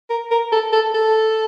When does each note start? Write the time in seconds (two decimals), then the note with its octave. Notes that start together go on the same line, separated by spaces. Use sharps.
0.10 A#4
0.31 A#4
0.52 A4
0.73 A4
0.95 A4